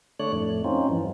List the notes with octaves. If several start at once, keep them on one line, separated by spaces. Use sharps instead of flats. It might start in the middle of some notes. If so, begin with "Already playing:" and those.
D3 A3 C#5 D5 F#6
F2 A2 A3
C4 C#4 D#4 F4
G2 E3 F3